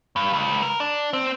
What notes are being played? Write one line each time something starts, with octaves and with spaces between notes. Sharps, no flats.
G2
C#2
A#4
D4
C4